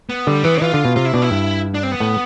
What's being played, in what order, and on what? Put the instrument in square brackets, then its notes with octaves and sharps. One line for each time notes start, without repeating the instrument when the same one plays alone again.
[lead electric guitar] B3
[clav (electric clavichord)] D3 [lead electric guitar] G3
[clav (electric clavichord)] E3 [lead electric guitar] B3
[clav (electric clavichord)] E3 [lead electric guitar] F4
[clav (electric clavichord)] D3
B2
[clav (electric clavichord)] C3 [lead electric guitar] F4
[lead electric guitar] E4
[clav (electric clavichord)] B2 [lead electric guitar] D4
[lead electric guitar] E4
[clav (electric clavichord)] G2
[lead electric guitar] D4
C4
B3
[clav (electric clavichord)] A2